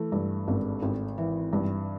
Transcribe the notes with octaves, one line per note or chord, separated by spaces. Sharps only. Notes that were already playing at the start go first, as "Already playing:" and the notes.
Already playing: E3 A3
G2
G#1
G#1
E3
G2